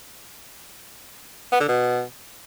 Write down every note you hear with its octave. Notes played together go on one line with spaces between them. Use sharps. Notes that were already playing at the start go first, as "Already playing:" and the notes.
B3
D3
B2